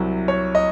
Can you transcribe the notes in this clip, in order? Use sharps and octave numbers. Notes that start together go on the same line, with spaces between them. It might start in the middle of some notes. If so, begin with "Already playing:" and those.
Already playing: C2 C3 F#3
C#5
D#5